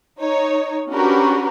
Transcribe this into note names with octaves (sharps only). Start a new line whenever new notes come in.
D#4 C#5
C#4 D4 F#4 G4 A#4 B4